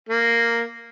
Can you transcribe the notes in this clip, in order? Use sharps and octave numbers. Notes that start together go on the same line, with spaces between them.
A#3